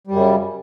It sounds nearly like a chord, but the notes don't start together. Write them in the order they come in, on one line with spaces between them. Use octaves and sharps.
G3 F#2 C#3